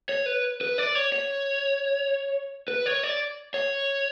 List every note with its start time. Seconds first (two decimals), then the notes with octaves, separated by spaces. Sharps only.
0.09 C#5
0.26 B4
0.61 B4
0.78 D5
0.95 C#5
1.12 C#5
2.68 B4
2.86 C#5
3.03 D5
3.54 C#5